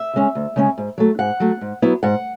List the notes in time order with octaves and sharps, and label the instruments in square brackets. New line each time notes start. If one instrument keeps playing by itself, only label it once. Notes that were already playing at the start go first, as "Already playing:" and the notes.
Already playing: [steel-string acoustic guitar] E5
C#3 G#3 C#4
D2
C#3 G#3 C#4
G#2
F#3 A3
G#2 F#5
F#3 A3
G#2
F#3 B3 E4
G#2 F#5